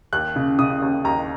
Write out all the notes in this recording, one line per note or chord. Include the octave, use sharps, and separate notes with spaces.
D#2 F#6
C#3
C#3 D#6
D#2
D#2 A#5